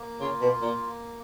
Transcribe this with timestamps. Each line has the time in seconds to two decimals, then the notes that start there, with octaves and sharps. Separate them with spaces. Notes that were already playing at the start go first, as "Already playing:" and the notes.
Already playing: A#3
0.20 C#3 F4
0.41 B2
0.52 A#3
0.62 A#2